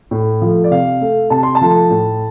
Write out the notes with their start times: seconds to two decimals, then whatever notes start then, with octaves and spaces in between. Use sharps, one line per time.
0.11 A2
0.42 F3 A3
0.64 D5
0.71 C3 F5
1.01 A3
1.30 C3 A5
1.43 C6
1.55 A5
1.61 F3 A3
1.91 A2